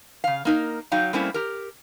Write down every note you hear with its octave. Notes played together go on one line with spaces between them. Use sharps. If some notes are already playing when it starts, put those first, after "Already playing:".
C#3 F5
A#3 D#4 A#4
F#3 D#4 F5 G5
G3 A3 A#3 C4 C#4 E4
G4 A#4